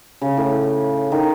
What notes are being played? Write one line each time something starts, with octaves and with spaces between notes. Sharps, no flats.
C#3
A2
D#3